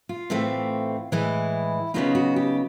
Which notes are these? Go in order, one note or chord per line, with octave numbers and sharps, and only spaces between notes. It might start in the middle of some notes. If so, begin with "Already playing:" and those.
F4
A2 E3 A3 C4
A2 E3 G#3 E4
C#3 F#3 B3 D#4 F4
F#4
G4